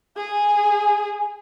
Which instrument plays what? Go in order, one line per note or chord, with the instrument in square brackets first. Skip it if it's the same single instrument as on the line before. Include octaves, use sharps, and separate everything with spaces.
[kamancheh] G#4 G#5